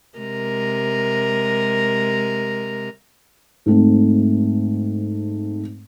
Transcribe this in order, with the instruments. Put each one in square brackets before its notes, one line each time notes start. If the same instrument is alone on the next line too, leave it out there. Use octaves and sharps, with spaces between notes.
[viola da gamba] C3 G#3 A#4
[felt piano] G#2 A3 C4